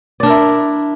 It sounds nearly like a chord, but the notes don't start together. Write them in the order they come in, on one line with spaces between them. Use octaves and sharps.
D5 D4 A#4 E4